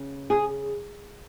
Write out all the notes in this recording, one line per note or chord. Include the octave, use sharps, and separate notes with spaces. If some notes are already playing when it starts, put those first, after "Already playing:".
Already playing: C#3
G#4